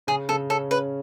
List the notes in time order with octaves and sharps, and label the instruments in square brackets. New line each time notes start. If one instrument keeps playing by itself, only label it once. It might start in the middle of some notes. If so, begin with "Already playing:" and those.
[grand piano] C#3 [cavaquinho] G#4
[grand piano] C#3 [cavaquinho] A4
[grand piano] C#4 [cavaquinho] A4
[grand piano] C#4 [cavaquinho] B4